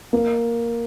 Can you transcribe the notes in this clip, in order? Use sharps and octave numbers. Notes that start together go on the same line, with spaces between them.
A#3